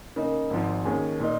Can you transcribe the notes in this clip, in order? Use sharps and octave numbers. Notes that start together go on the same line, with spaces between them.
C#3 A#3 D#4
G#1 G#2 F3
D#2 D#3 C#4 G#4
A#2 A#3 D#4